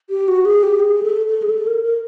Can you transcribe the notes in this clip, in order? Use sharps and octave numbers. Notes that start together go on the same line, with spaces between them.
G4
F#4
G#4
G4
G#4
A4
A4
G#4
A4
A#4
A#4